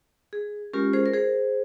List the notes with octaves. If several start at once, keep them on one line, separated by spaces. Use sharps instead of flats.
G#4
G#3 C#4 F4 G4 A#4
G#4 C5
A#4
G#4 C5